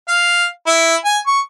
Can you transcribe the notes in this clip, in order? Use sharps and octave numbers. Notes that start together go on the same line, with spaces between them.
F5
E4
G#5
C#6